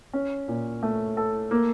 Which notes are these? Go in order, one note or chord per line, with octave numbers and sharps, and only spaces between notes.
C#4
A#2
A3
A4
A#3